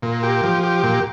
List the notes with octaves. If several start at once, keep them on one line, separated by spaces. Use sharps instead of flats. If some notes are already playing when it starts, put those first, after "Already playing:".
A#2
G4
F3
G4
A#2